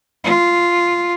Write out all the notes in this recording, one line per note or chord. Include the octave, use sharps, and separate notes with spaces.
F4